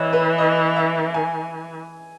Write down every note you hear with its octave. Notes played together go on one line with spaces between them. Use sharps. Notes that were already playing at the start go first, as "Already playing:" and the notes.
Already playing: E3 C#5 D#5 E5
B4
D#5
E5
G#5